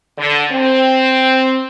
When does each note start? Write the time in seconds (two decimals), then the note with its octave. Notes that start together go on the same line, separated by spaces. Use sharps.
0.18 D3
0.51 C4